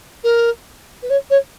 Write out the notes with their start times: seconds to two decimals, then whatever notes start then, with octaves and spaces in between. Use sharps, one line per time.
0.23 A#4
1.02 B4
1.10 C#5
1.30 C#5